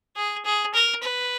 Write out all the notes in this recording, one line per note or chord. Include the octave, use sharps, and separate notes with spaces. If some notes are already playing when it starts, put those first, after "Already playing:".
G#4
G#4
A#4
B4